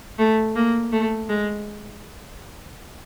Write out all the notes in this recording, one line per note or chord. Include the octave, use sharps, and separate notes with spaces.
A3
A#3
A3
G#3